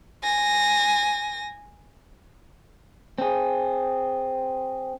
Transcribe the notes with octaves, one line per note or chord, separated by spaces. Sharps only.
G#5 A#6
C4 G#4